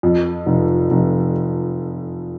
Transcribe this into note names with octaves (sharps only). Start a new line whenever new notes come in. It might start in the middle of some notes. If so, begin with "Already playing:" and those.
F2
F1
F1